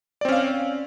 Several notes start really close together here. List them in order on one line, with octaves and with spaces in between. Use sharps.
D5 C4 C#4 F5